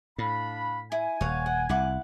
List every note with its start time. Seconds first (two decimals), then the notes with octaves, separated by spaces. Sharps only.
0.18 A2 D4 F5 B5
0.92 E4 G#5
1.21 D#1 C#5 F5 F#5
1.46 F#5
1.69 C2 E4 F#5 D6